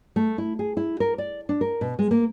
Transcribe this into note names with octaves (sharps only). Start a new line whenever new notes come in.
A3
E4
G#4
E4
A#4
D5
D4
A#4
B2
G#3
A#3